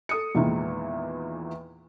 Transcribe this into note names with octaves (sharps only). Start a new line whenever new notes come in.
A4 D#6 C#7
E2 A#2 D#3 E3 G#3